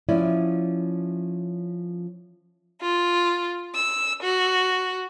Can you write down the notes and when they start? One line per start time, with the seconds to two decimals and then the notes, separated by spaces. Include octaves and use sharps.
0.09 F3 C#4 E4 D5
2.82 F4
3.75 E6
4.23 F#4